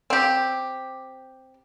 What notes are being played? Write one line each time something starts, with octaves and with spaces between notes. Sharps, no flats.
C4 G4